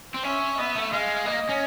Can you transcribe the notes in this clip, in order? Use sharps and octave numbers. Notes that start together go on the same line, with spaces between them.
C4
C#4 E5
B3 E5
A3
G#3 F5
A#3 D#5
C#4